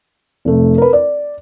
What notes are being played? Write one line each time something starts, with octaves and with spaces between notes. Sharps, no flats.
F1 A3
A#4 B4
D5